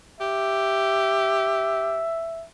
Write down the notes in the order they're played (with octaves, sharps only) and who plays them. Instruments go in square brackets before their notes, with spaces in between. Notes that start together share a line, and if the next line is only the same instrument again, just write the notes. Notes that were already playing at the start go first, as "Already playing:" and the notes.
[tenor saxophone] G4 [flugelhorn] E5